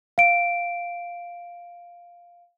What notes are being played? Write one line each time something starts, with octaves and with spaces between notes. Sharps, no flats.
F5 D7